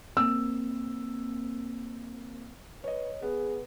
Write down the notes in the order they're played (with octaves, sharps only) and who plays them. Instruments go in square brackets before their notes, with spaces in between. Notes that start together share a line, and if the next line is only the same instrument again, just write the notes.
[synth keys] A#3 C4 [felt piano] E6
[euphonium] B4 [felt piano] C#5 D#5
[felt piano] B3 [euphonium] G#4